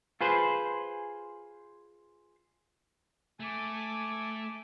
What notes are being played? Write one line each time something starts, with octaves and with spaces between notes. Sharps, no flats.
F4 G#4 B4 C5
A3 G#5 D6